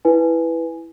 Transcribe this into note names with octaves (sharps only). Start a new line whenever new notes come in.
E4 B4 G#5